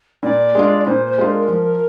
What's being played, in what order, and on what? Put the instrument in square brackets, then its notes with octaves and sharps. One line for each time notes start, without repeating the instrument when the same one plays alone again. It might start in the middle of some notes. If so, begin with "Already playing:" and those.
[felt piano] A#2 [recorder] D5
[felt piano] G#3 D4 F4
[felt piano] A#2 [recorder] C5
[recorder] C5
[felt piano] G#3 D4 F4
[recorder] A#4
[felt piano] F3